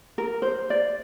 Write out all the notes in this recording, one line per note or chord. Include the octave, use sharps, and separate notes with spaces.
A#4
C5
D5